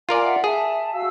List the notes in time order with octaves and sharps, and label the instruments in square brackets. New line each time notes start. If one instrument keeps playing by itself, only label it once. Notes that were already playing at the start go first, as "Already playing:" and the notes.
[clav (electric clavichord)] F4 A#4 D5 [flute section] G#5
[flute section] E5 F#5
[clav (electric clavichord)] G#4 [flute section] E5 A5
[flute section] F#4 F5 E6